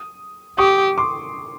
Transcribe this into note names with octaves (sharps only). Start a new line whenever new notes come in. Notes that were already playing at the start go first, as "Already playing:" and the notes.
Already playing: D#6
G4 C#6 D#6
C6 D6